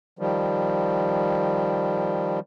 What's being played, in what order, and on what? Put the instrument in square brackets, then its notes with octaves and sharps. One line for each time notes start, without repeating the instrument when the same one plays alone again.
[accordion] D#3 F3 G3